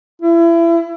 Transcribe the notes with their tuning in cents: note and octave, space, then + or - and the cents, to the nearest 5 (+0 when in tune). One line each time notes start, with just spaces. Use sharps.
E4 +30